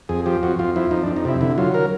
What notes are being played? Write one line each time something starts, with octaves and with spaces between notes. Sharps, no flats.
F2 G#4
F3 G4
F2 F#4
F2 F4
F3 E4
F2 D#4
D4
F2
D#4
C3 E4
D3 E4
F#3 F4
A#4